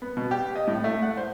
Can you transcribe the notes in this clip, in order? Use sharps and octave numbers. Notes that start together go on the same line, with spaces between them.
B3
B2
G4
D#5
A2
A3
F#5
C5